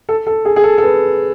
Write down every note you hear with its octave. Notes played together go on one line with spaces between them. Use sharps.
A4
A4
G#4
G#4
A4
A4
B4